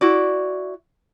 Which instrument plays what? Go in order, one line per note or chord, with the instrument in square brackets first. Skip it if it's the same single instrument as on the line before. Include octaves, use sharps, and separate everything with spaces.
[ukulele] E4 F#4 D5